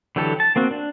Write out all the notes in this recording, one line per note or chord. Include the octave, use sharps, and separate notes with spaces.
D3 E3 F#3 G4 A4
A5
A#3 C4 F#4
D4